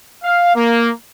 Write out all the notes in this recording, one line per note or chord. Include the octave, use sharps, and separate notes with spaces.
F5
A#3